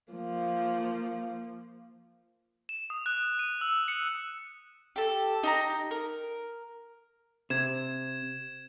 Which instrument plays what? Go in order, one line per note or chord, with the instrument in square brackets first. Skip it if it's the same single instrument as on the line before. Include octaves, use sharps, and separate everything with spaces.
[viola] F3 A#3
[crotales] E7
D#6
F#6
D#7
E6
C#7
[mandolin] G4 A4
D#4 G4 A#5
A#4
[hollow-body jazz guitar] C3 [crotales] G#6 E7